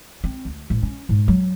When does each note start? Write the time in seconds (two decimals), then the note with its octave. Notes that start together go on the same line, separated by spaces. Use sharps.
0.24 C4
0.45 D2
0.70 A1
0.83 C#4
1.09 G#2
1.28 F#3